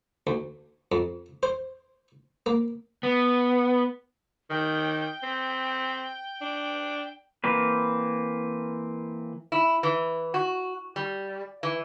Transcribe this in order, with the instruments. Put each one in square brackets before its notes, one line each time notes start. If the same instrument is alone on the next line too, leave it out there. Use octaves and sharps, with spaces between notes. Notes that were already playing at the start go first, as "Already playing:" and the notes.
[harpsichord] D2
F2
C5
A#3
[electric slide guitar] B3
[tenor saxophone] D#3 [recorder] G5
[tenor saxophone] C4
D4
[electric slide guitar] E3 A#3 C4 B4
[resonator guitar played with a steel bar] E4
E3
F#4
G3
E3